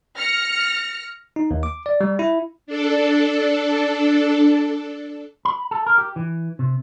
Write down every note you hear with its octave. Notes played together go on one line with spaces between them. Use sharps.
F6 A#6 C#7
D#4
D#2
D6
D5
G3
E4
D4 A4
B5
A4
A#4
G4
E3
C3